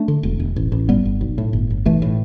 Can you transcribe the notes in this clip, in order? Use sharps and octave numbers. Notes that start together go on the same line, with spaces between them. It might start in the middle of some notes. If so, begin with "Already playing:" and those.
Already playing: A3 D4
D3
E1
E1
A1
A1
G1 G3 B3
G1
B1
A2
G1
G1
B1 E3 A3
A2